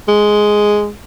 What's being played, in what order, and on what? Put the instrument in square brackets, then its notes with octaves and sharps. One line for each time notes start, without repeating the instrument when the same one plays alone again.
[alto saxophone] G#3